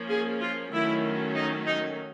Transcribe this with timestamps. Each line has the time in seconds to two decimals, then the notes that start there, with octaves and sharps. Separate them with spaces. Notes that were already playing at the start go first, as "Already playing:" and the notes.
Already playing: F3 A#3 C#4
0.09 G#4
0.41 F4
0.72 D#3 F#3 A3 C#4 E4
1.36 D#4
1.67 D#4